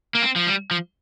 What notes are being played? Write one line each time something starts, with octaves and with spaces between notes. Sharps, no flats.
A#3
C4
F3
G3
F3